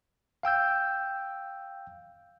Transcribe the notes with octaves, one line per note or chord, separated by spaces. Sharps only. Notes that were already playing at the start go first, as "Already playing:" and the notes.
F5 G5 E6 G6